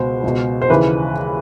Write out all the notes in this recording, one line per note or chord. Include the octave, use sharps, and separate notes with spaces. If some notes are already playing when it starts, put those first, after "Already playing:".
Already playing: C#2 B2 C5
C#2 B2
C5
D#2 C#3 E3 B4